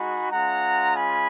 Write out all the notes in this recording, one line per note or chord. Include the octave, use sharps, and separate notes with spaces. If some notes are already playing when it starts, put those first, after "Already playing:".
Already playing: G#3 D#4 F#4 G#5 B5
G#3 C#4 F4 F#5 A#5
G#5 B5